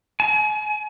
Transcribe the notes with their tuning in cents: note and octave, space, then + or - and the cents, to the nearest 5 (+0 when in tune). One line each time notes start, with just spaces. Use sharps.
G#5 +40